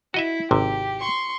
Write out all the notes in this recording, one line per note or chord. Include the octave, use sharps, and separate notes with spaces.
E4 F#4 D#5 E5
G#1 C3 G4
C6 C#6